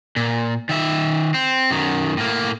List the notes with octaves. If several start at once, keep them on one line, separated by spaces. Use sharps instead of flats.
A#2
D#3 E5
C4
F#2 D#3
A2 A#3